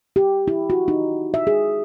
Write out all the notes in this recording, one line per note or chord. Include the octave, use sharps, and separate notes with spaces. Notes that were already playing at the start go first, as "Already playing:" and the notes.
G4
E4
F#4
D#4
E5
G#4